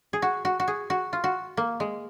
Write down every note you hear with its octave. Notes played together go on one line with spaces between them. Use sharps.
G#4
F#4
F#4
F#4
G#4
F#4
F4
F#4
A#3
G#3